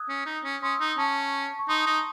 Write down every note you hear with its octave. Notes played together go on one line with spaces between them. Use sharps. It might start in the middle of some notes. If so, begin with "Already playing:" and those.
Already playing: D#6 E6 F#6 G#6
C#4
D#4
C#4
C#4 C6 D#6
D#4 E6
D#6
C#4 A5 C#6
C#6
D#4 C6 D#6
D#4